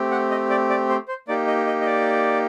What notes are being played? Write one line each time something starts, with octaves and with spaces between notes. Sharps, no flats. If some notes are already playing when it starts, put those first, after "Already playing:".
Already playing: A3 C4 G4
F#5
D#5
D5
D5
C5
C5
A#3 D#4 G4 D5
D#5
D#5
D#5
D5